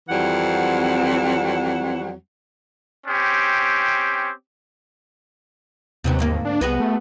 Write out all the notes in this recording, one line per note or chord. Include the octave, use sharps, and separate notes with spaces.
F2 E3 F#3 G3 C4 F#5
C4 C#4 G4
D#2 C3 F#3 B3
D2 G#2 A#3
D4
C2 B3 F#4 G#4
A3